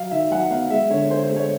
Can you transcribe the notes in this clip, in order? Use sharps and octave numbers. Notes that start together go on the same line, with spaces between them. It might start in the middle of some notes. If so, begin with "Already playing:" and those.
Already playing: F#3 F5
D#3 E5
F#3 F#5
B3 F5
G#3 E5
D3 C#5
D3 C5
C5
G#3
C#5